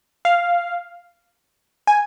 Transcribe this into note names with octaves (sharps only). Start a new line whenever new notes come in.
F5
G#5